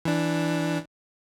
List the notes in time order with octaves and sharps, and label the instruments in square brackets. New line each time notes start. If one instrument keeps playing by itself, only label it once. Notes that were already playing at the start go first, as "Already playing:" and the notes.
[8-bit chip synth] E3 D4